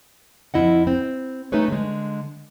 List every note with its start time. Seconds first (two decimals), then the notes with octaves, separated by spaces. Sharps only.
0.54 F2 E4 D#5 F#5
0.87 C4
1.52 A3 D#4 G#4 B4 C#5
1.68 D3 G#3